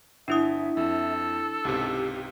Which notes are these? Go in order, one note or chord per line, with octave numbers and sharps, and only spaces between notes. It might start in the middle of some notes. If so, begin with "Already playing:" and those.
G1 D4 E4 E5 D#6
F2 A4
C#2 G#2 C3 G4